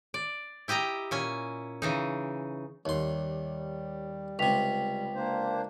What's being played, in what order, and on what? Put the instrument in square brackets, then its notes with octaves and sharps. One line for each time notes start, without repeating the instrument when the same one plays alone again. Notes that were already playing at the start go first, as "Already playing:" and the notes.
[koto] D5
E4 G4 D#5 G5 A#5
A#2 C#4 G#5
C#3 E3 D#4
[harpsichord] D#2 C6 [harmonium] G3 [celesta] C#5
[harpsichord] C#2 C3 [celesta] G5 B6 F7
[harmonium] A#3 D4 C5